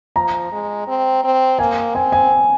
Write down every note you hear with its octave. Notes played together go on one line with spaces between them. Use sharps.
F3 A#5
G#3
C4
C4
A#3 G#5
C4 G#5
G#5